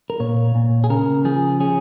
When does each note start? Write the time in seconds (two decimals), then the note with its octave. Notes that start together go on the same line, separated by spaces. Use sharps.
0.10 A#4
0.20 A#2 C#5
0.55 A#2
0.84 G#4
0.90 C#3 A#4
1.25 F3 G#4
1.60 C#4 G#4